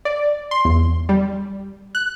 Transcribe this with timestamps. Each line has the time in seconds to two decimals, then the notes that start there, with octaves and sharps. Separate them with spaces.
0.05 D5
0.51 C6
0.65 E2
1.09 G3
1.95 F#6